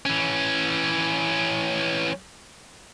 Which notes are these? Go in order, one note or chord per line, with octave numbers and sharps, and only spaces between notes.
E3 C#4